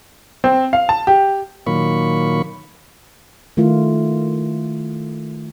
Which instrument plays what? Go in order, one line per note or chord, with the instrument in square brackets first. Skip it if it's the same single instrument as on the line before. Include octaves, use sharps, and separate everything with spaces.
[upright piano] C4
F5
A5
G4
[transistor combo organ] A#2 D#3 F#3 A#3 B5 C#6
[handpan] D#3 A3 E4 F4